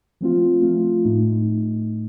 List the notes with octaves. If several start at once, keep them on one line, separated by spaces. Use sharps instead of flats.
F3 A3 C4 F4
F3 A3 C4 F4
A2 A3 D#4